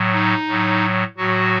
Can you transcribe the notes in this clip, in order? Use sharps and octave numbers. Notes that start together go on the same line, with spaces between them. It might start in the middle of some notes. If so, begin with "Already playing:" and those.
Already playing: A2 F#3
D#4
A2 F#3
A2 F#3 F#4